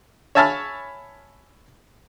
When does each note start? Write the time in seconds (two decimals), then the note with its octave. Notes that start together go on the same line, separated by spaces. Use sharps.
0.35 C#5 E5 G#5 A5 B5 F6